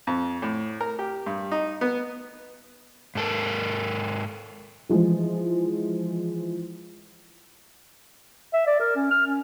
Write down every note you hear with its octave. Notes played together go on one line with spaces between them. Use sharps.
F2
A2
A#4
G4
G2
D#4
B3
G#2 A4 A#4
E3 F3 G#3
E5
D5
A#4
C#4
F6
C#4